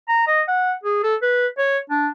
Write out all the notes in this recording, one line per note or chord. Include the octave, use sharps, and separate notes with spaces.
A#5
D#5
F#5
G#4
A4
B4
C#5
D4